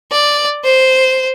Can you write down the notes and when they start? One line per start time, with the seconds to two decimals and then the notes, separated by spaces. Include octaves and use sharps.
0.12 D5
0.64 C5